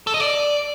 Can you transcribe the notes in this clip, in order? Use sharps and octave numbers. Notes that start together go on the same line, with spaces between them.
A4
D#5
D5